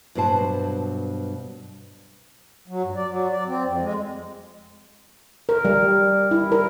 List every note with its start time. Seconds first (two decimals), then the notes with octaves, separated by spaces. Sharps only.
0.15 G2 B2 F#3 C5 A5
2.68 F#3
2.83 G2
2.95 D5
3.09 F#3
3.31 D5
3.47 C4
3.64 F2
3.81 G#3
5.49 A#4
5.65 G3
6.31 E4
6.52 A#4